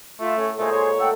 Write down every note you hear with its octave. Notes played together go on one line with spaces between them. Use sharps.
A3 F4 E5
A2 C#4
A#2 G#3 A3 G#4 C5 A#5
C#5
A3 F#5 G5 E6